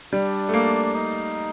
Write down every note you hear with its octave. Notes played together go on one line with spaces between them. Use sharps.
G3 D4
A3
A#3
D#4